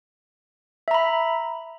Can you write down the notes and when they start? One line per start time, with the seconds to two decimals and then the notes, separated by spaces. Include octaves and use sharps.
0.88 E5
0.91 A#5
0.94 B5